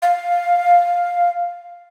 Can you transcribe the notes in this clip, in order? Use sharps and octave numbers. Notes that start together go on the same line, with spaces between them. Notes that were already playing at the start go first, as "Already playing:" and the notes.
F5